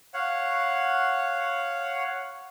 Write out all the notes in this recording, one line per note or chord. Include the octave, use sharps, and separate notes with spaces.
C#5 F5 F#5